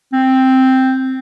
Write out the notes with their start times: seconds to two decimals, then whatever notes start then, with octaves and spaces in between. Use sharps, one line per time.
0.13 C4